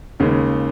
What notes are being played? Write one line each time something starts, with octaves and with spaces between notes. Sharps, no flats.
D#2 C#3 G#3 C#4